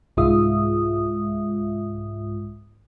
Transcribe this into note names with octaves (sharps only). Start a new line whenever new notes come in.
C2 G#2 G#3 F4 E5 D#6